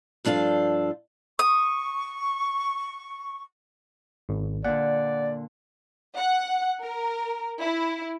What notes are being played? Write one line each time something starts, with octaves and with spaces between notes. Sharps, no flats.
G2 F3 D4 A4 F5
C#6 D#6
G#1
A#2 D3 D5 F#5
F#5
A#4
E4